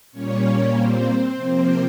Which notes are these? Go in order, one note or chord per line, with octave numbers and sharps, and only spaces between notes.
A#2 G3 A#3 C#4 C#5
C4 C5
C3 F3 A#3